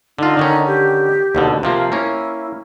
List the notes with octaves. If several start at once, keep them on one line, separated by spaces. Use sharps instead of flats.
D3 D#4 F4
D3 D#3 C#4
G4
D#2 B2 D3
C3 F3 A#3 F5
A#3 C#4 E4